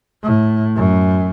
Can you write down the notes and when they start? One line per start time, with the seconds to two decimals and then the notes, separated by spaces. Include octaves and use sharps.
0.23 A2
0.76 F#2